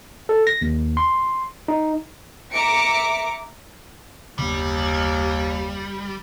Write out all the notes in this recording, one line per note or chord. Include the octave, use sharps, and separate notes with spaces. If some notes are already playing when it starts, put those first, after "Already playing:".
A4
A#6
D#2
C6
D#4
E5 A#5 D6 C#7 D7
F#1 D#2 D3 G3